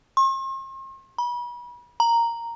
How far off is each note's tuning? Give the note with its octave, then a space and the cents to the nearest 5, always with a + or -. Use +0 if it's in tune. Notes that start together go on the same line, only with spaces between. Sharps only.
C6 +45
B5 -35
A#5 -5